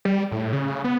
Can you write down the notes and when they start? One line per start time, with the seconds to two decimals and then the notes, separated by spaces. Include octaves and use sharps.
0.05 G3
0.31 A2
0.53 C#3
0.84 B3